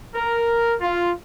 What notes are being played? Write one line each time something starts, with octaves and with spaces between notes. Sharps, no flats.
A#4
F4